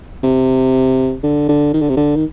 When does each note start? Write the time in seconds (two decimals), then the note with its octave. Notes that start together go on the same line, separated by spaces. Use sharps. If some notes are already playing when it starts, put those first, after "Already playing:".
0.23 C3
1.23 D3
1.49 D3
1.74 D#3
1.81 D3
1.89 C3
1.97 D3
2.16 D#3